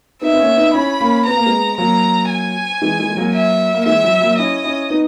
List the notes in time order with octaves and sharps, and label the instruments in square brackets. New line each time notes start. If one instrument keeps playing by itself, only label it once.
[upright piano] B3 D#4 [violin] E5
[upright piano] B3
A#3 C#4
B3 D#4
[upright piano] C#4 E4 [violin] B5
[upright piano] A#3 C#4
[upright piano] B3 [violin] A#5
[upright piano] A#3
G#3 B3
[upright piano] F#3 A#3 [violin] A#5
[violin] G#5
[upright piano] E3 G#3
E3 G#3
G#3
F#3 A#3
[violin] E5
[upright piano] A#3
[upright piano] E3 G#3 [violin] E5
[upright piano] F#3
F#3 A#3
[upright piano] C#4 E4 [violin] D#5
[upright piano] C#4 E4
B3 D#4